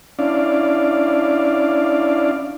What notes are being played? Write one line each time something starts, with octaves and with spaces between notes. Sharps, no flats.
C#4 D4 E4 D5 F5